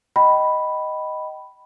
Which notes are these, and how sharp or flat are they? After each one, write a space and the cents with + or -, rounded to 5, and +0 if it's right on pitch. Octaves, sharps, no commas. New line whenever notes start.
D#5 +0 G5 -30 B5 +0